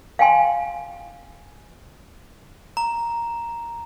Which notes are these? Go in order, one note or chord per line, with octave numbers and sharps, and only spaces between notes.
F5 G5 G#5 C6
A#5